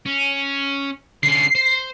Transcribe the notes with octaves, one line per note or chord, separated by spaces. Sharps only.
C#4
D3 C#4 C7
C5